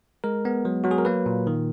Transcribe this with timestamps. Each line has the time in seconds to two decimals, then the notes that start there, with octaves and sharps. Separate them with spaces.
0.24 G#3 A#4
0.45 B3
0.65 F#3
0.84 F#3 F#4
0.91 G#4
0.98 A#4
1.05 A#3 B4
1.26 A#2
1.47 D#3